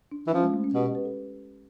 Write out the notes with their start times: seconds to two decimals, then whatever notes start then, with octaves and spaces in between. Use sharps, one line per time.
0.12 D4
0.27 E3
0.33 F3 C#4
0.43 G#3
0.54 A3
0.64 C#4
0.74 B2 G4
0.84 B4
0.95 B4
1.05 A4